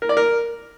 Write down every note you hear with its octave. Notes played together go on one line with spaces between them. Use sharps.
A#4
D5
A#4